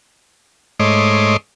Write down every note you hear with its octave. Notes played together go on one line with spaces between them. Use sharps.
G#2 A3 C#5 D#5 C6 D6